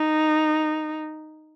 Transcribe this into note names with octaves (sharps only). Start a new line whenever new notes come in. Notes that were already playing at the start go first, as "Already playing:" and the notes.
Already playing: D#4